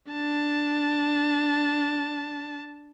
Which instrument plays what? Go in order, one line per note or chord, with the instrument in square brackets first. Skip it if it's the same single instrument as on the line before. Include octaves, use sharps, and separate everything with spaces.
[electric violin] D4 A5